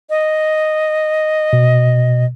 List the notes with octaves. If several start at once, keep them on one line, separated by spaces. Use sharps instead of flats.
D#5
B2